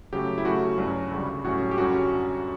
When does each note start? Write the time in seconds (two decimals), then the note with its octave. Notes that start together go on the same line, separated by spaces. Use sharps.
0.13 C#3 F#3 A3 G4
0.38 E4
0.45 C#3 F#3 A3 C#4 F#4
0.78 G2 F#3 C#4
1.11 D2 C#3 G3
1.44 A2 F#3 C#4 F#4
1.71 G4
1.77 F#2 D3 G3 C#4 F#4